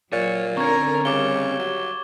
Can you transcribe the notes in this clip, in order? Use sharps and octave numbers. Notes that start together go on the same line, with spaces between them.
A#2 F#3 C#5 A6
D3 C4 C#4 A#4 A#5 C#6 G#6
C#3 G3 D6 G7
F#3